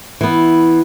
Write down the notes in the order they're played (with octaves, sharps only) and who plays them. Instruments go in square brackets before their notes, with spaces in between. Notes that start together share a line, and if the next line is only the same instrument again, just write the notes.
[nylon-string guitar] E3 B3